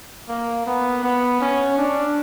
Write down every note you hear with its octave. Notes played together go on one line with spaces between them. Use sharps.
A#3
B3
B3
C#4
D4